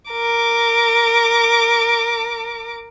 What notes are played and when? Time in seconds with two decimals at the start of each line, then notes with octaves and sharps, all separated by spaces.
0.11 A#4 D6